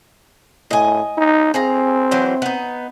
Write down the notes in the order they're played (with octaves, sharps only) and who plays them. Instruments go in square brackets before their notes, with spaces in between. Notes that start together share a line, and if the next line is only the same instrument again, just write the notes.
[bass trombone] A2 [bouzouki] D#5 G#5
[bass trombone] D#4
[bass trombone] C4 [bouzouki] G#4 F5 A#5
[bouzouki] E3 F#3 C5
B3 D#4